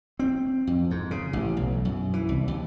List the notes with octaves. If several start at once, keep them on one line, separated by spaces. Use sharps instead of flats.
C4
F2
G#2
C#3
A1
B1
F#2
E3
C2
D#2